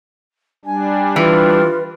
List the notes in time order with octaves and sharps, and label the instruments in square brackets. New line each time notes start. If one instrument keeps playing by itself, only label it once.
[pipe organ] G3 D4 [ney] G#5
[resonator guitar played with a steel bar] E3 [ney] F4 [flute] B4